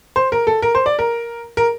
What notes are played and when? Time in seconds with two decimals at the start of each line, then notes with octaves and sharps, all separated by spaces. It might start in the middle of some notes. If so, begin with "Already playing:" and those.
0.16 C5
0.32 A#4
0.47 A4
0.62 A#4
0.75 C5
0.86 D5
0.99 A#4
1.57 A#4